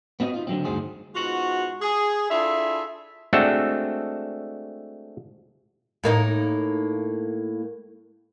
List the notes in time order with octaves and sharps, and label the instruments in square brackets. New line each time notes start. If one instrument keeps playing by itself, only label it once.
[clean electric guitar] B3 C4 F#4 D#5
D#4 F4
D3 F#3 C4
D2 G2 D#4 F#4 G#4 C5
[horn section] G#2 B2 F4 F#4
G#4
D4 E4 F4 G#4 A4 E5
[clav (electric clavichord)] G#3 A3 C4 D4 F#4 A4
[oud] A2 A#3 D#4